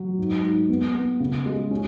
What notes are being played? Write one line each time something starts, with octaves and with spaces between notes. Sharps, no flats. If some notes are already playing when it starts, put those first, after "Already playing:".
Already playing: F#3
G#2
G#2
B3
B3
C#3
G#3
C#4